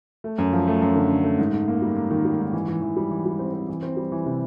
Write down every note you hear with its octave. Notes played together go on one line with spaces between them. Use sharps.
A3
F#2
F3
A3
F#2
D3
D3
A3
G#2
G#2
A#3
G3
A#3
D#3
G3
G#2
E3
E3
E3
G3
E3
G3
C4
C4
E3
C4
G3
E3
C3